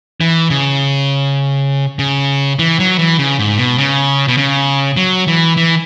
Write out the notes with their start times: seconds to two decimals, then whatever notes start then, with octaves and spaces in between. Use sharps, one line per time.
0.21 E3
0.50 C#3
1.99 C#3
2.59 E3
2.79 F#3
2.98 E3
3.19 C#3
3.39 G#2
3.58 B2
3.78 C#3
4.28 B2
4.37 C#3
4.97 F#3
5.27 E3
5.57 E3